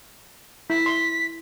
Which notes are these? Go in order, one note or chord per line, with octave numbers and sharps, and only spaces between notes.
E4 B6
C6